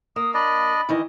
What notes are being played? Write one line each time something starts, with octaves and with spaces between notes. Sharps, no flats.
A#3 D#6
D4 D5 D#5 B5
D#3 E3 D#5